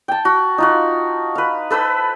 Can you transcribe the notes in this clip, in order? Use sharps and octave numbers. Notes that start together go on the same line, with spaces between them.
G5 A5
F#4
D#4 F4 F#4
B4 F5
A4 B4 C5 E6